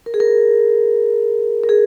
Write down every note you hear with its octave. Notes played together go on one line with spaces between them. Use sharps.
A#4
G#4
A#4
A#4
G#4